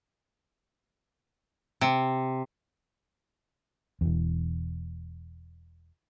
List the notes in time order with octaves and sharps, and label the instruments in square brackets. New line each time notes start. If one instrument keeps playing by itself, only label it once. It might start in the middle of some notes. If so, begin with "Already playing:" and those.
[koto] C3
[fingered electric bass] E1 E2